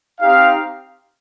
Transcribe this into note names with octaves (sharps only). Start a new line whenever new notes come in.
C4 D#4 G4 F5